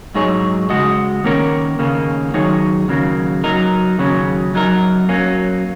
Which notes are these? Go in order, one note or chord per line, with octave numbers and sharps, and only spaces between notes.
G#2 F#3 D#4 G#4 C#5
C#3 G#3 F#4 D#5
D#3 A#3 C#4 A#4 C#5
D#2 C#3 A#3 C#4
D#3 F#3 D#4 G#4 C#5
D#2 C#3 F#3 A#3
F#3 D#4 A#4
D#2 C#3 F#3 C#4
F#2 F#3 D#4 A#4
F#3 A#3 C#4